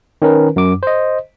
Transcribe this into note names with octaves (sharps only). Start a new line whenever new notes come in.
D#3 C#4 A#4 B4
F#2 D6
C5 D#5